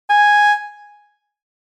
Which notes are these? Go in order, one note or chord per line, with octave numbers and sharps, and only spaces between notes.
G#5